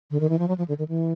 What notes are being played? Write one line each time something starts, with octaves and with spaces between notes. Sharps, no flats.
D3
D#3
E3
F3
F#3
F3
D3
D#3
E3